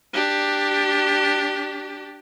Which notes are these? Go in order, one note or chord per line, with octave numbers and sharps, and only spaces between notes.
D4 G4